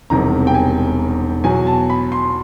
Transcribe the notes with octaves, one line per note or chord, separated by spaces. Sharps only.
E1 E2 C3 D#3 G3 A#5
G5
G#5
E2 B2 F#3 G#5
A5
B5
C6